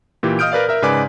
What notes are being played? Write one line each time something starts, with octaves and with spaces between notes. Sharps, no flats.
A#2 E3 G4
D#5 F5 D#6 F6 G6 D7
A#4 B4 D5 F5
A#4 E5
G#2 C#3 B4 D5 G#5 D6